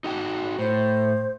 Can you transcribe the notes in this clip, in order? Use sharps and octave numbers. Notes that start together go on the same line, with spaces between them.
D#4 F#4 G5
A2 C5